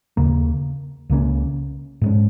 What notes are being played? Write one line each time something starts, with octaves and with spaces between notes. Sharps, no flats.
D#2 C#3 A#3
C#2 C#3 A#3 C#4
G#2 G#3 C#4